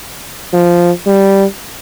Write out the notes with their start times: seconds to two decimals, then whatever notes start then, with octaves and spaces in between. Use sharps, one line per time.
0.54 F3
1.07 G3